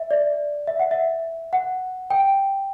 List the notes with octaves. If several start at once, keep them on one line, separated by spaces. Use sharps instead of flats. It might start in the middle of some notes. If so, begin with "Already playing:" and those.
Already playing: E5
D5
E5
F#5
E5
F#5
G5